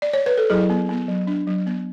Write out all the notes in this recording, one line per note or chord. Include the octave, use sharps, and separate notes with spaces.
D5
C#5
B4
A4
F#3 E4 G#4
B3
B3
F#3
D4
F#3
B3